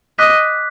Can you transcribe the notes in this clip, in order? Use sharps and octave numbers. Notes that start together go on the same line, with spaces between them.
D#5 D6 F#6 B6